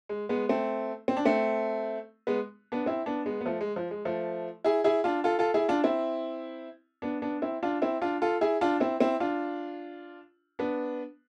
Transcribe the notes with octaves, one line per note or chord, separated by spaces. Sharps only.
G#3
G#3 B3
A3 C4
C4
D4
A3 C4
G#3 B3
B3 D4
C4 E4
B3 D4
G#3 B3
B3
F3 A3
G#3
F3
G#3
F3 A3
E4 G#4
E4 G#4
D4 F4
F4 A4
F4 A4
E4 G#4
D4 F4
C4 E4
B3 D4
B3 D4
C4 E4
D4 F4
C4 E4
D4 F4
F4 A4
E4 G#4
D4 F4
C4 E4
C4 E4
D4 F4
B3 D4